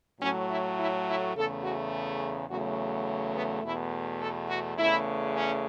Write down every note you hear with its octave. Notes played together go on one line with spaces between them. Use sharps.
A2 F#3 A3 C#4
E4
E4
E4
E2 C#3 A3 A4
F#4
E2 C#3 F#3 A3 F#4
B3
E2 B2 A3 E4
A4
F#4
E2 C#3 A3 E4
C#4